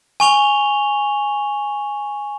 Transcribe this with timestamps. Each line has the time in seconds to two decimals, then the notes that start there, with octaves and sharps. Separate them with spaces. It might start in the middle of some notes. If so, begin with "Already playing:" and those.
0.20 G#5 C#6 F7 G7